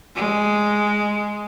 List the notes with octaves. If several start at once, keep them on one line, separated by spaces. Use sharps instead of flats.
G#3